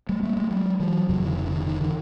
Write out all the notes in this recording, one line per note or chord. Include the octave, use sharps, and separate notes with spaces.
G3 A3
G#3 A#3
G3 A3
F#3 G#3
E3 F#3
F1 F2 C#3 E3 F#3
D3 E3
D#3
D3
D#3
D#3
D3 E3